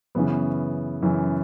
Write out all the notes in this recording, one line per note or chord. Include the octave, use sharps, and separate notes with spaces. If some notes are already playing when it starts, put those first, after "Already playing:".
F#2 C#3 E3 B3
F#2 C#3 E3